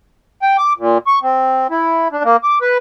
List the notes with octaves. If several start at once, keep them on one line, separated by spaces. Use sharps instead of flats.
G5
D6
A#2
C#6
C4
E4
D4
A#3
D6
B4